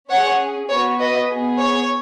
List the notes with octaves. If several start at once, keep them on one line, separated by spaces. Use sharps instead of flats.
C#4 G#4 C#5 F#5
B3 F#4 C#5
B4 D#5
B3 G#4
C#5